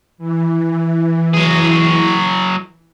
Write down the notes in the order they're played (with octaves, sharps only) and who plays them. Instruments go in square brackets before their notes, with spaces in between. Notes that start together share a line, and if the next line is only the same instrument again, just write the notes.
[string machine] E3
[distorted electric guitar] F#3 G#4